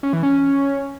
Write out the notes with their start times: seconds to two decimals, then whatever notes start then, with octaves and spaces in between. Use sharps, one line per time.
0.03 C#4
0.13 E3
0.23 C#4